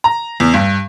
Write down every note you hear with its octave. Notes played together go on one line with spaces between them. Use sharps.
A#5
E2
G2